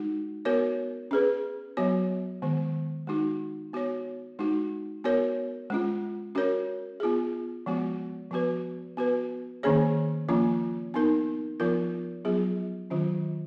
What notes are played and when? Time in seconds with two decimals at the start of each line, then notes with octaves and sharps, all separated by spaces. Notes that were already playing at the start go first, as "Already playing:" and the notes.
Already playing: G#3 D#4 F#4
0.45 B3 F#4 A#4 C#5
1.11 C#4 G#4 B4
1.77 F#3 B3 F#4 C#5
2.42 D#3 G#3 B3
3.07 G#3 D#4 F#4
3.73 B3 F#4 C#5
4.39 G#3 D#4 F#4
5.04 B3 F#4 A#4 C#5
5.70 G#3 C#4 F4
6.35 C#4 F#4 A#4 C#5
7.00 B3 F4 G#4
7.66 F3 G#3 B3 F#4
8.31 F3 B3 F#4 B4
8.97 B3 F#4 B4
9.63 D#3 A#3 C#4 G#4 C#5
10.29 F3 A#3 C#4 F4
10.94 B3 D#4 A#4
11.60 F3 B3 F4 A#4
12.25 F#3 B3 F4 G#4
12.90 D#3 F#3 C#4 F4